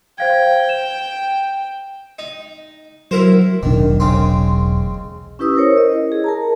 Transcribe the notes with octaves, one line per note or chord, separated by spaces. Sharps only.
C5 F5 G5 G#6
E7
D#4
F#3 E4 A#4 C5
E1 B1 D#3 D4
C#3 G#3 C4
C#4 E4 G4 B4 D#6 E6
A#4 C5 C#5
D#5
E4
G#4
A#4 A5 A#5